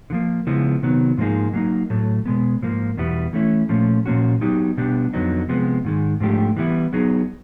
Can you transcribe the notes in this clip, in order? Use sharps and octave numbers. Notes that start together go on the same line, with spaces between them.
D3
F3 A#3
C#3 F3 G#3 B3 E4
C3 D#3 F#3 B3
G#2 F3 A#3 D#4 G#4
F#3 A#3 D#4
A2 F#3 A3
B2 G#3 B3
G#2 F3 A#3
E2 B2 G3 B3 E4
E3 A3 C#4 E4
A#2 F3 A3 C#4
A#2 F3 A#3 C#4 F#4
F#3 B3 D#4 G4
B2 G3 B3 D4 G4
F2 D3 F#3 B3 D#4
C3 F3 G#3 B3
G#2 D#3 G#3
G#2 F3 A3 D4 G4
E3 G3 B3 E4
F#3 B3 D#4 G#4